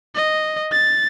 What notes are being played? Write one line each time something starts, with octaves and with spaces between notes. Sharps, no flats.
D#5
A6